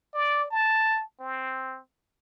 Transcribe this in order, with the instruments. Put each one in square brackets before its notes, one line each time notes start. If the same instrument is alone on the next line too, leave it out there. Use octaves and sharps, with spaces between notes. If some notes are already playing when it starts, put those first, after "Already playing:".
[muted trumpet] D5
A5
C4